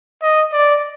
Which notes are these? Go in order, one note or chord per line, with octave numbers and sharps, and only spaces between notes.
D#5
D5